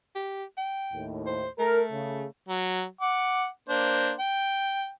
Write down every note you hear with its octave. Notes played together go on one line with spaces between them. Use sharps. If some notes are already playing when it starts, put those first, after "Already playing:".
G4
G5
D#2 A2
C5
A3 A#4
C#3
F#3
F#5 D6
A#3 D4 C5
G5